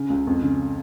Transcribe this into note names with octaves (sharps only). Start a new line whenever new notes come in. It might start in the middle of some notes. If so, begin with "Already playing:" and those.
Already playing: C#3
C#2
F2
C#3